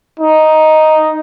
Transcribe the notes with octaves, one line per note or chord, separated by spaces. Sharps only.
D#4